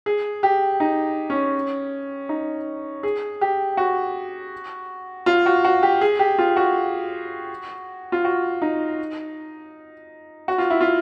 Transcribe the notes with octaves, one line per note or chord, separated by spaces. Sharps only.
G#4
G4
D#4
C#4
D#4
G#4
G4
F#4
F4
F#4
F#4
G4
G#4
G4
F4
F#4
F4
F#4
D#4
F#4
F4
E4
F4